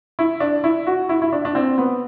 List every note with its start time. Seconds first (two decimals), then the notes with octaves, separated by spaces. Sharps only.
0.19 E4
0.40 D4
0.64 E4
0.87 F#4
1.09 E4
1.22 E4
1.33 D4
1.45 D4
1.55 C4
1.78 B3